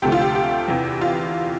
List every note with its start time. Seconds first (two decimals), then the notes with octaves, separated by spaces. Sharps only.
0.02 D2 C3 F3 A3 G4
0.12 F4
0.21 G4
0.35 G4
0.68 E2 C3 E3
1.01 F4